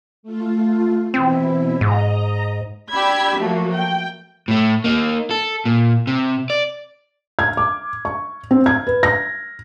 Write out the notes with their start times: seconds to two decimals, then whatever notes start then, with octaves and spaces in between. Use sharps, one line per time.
0.23 A3 F4
1.14 B2 E3 C4 E4
1.81 G#2 D#5 A#5
2.92 D4 G4 B5 E6 G#6 B6
3.37 F3 F#3 A3 A#3 F#4
3.76 G5
4.48 A2 A3
4.84 A#3 D#4
5.31 A4
5.65 A#2
6.07 C3
6.50 D5
7.39 G#6
7.57 D6
8.05 C#6
8.51 C4
8.66 G#6
8.87 B4
9.03 A#6